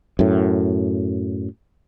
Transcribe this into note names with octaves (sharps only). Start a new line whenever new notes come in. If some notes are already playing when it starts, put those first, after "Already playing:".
F#2 A2